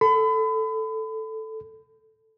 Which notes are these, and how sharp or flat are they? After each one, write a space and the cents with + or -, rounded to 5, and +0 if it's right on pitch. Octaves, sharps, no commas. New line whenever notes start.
A4 +0 B5 +35